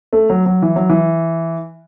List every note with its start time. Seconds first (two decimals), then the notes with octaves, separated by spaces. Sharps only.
0.13 A3
0.30 F#3
0.46 F#3
0.62 E3
0.76 F#3
0.89 E3